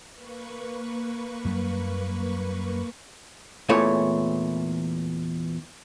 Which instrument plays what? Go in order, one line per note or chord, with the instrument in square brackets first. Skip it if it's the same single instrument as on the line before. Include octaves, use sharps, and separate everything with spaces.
[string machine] A#3 B4 C#6
[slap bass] F#2 F#3 G3
[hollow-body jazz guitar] E2 A#2 E3 A3 C#5